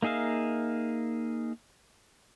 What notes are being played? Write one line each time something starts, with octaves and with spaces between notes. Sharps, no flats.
A#3 D#4 G#4 E5 F5